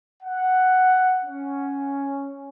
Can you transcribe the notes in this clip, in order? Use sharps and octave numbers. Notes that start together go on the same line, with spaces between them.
F#5
C#4